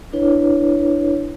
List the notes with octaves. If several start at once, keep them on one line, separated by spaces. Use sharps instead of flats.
D4 E4 B4 C#5